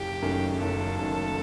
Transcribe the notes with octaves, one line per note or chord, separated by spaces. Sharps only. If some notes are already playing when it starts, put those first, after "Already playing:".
Already playing: F#1 G4
F#2 D#3 A3
F#1 A4
F#2 D#3 A3